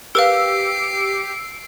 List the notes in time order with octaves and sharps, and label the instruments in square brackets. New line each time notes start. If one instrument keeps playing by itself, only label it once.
[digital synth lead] G4 [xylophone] A#4 B4 F5 [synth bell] E6 [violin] C7 D7